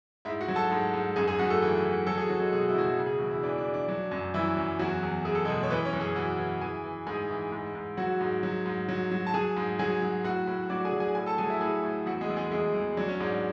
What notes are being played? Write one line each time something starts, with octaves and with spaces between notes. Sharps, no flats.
G#2 E4 E5
F#4 F#5
F#3
A4 A5
G#2
G#2
F#2 G#4 G#5
G#4 G#5
F#2 F#4 F#5
A3 A4
E3
E3
F#3 A4
G#4
F#3 F#4
G#3 G#4
B2 G#4
F#4
E4
B2 F#3 F#4
C#3
G#4
E2 F#4
E4
E3 D4
D4
E3
D4
F#3 D4
F#2
E3 F#3 E4
F#2
E2 F#3 F#4
E2
E2 G#4
A4
B2 G#3 G#4
C#5
E3 B3 B4
C#4 C#5
F#2
G#4 G#5
E3 F#4 F#5
E3
E3 G#4 G#5
E3
G#2 G#4 G#5
E3
G#2
G#2
F#3 F#4 F#5
G#2
F#3
G#2
F#3
F#3
A5
F#3 G#4 G#5
G#2
F#3 G#4 G#5
F#3
A2 F#4 F#5
A2
F#3 D4 D5
G#4 G#5
F#3
G#4 G#5
A2 G#4 G#5
A4 A5
F#3 G#4 G#5
E4 E5
A2 G#4 G#5
A2
E2 F#4 F#5
G#3 G#4
E2
G#3 G#4
E2 G#3 G#4
E2
F#3 D4
C#4
G#2 D4